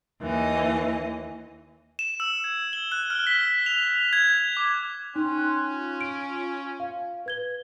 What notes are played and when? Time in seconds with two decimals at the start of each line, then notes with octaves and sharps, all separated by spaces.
0.21 D#2 E3 D#5
1.99 E7
2.20 E6
2.44 G#6
2.73 G7
2.92 F#6
3.10 F6
3.27 B6
3.66 F7
4.13 G#6
4.57 D6
5.16 C#4 D#4 G5 C6 F#6
5.66 F4
6.01 D7
6.80 F5
7.26 B4 G#6 G7